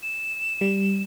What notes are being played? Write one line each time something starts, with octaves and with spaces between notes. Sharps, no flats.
E7
G3